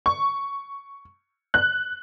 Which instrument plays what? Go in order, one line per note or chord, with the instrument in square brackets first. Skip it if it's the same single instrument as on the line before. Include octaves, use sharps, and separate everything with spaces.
[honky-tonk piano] C#6
F#6